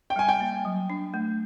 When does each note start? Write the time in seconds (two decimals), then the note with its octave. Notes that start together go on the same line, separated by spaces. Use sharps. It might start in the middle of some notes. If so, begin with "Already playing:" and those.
0.10 G5
0.16 G3 G#5
0.28 G5
0.41 A#3
0.65 F#3
0.90 D4
1.14 A3